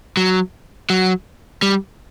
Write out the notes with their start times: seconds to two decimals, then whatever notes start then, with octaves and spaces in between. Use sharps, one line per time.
0.17 F#3
0.90 F#3
1.62 G3